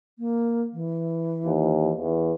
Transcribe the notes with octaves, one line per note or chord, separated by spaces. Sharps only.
A#3
E3
D#2
E2